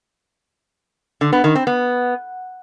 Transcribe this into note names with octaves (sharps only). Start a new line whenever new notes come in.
D3
B3
D#3
C4
B3